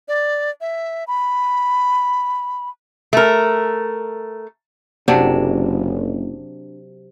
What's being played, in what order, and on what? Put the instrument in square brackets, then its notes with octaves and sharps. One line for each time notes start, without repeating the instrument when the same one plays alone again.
[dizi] D5
E5
B5
[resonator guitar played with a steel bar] A3 A#4
[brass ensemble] F#1 [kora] C3 F#3 D4